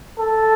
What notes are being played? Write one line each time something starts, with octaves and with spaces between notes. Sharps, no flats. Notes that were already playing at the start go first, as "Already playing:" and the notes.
A4